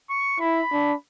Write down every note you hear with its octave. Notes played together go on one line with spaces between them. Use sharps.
C#6
E4 B5
D4